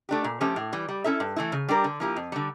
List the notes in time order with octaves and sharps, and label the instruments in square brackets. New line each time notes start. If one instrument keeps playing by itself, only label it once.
[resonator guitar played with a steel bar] A3 D4 G4
A#2
F3 A3 C#4 G4
A2
E3 G3
G3
C#4 E4 A4 E5
G2
E3 A3 E4
C#3
G3 D4 G4 A#4
D3
F3 A#3 E4 G4
F2
D3 G3